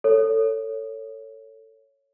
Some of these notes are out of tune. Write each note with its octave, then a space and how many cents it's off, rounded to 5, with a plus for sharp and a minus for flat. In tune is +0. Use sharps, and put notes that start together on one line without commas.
A4 +25 C#5 +0